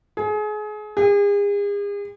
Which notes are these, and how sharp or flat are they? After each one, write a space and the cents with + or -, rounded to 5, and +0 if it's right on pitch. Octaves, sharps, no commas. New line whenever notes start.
G#4 +30
G#4 -40